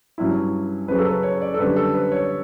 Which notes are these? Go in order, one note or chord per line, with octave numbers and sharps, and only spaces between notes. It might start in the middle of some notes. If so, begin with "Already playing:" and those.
G2 F#3 C#4 E4
F#2 C#3 F#3 B4
A4
B4
C#5
D5
A4
F#2 D3 G3 D4 B4
A4
B4
C#5